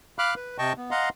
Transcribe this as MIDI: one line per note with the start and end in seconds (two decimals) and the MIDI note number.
0.19 0.34 77
0.19 0.34 83
0.19 0.34 86
0.19 0.34 89
0.19 0.34 90
0.36 0.57 71
0.58 0.73 48
0.58 0.73 75
0.58 0.73 79
0.58 0.73 81
0.58 0.73 85
0.77 0.91 59
0.91 1.09 75
0.91 1.09 77
0.91 1.09 78
0.91 1.09 82
0.91 1.09 84